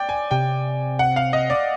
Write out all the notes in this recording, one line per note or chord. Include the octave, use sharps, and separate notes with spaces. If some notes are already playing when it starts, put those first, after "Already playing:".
Already playing: D5 G5
G#5
C3 G5
F#5
F5
D#5
D5